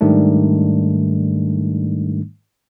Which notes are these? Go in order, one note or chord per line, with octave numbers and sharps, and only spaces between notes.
G#2 D#3 G3 A3 D4